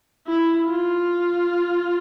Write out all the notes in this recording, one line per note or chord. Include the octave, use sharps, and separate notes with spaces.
E4
F4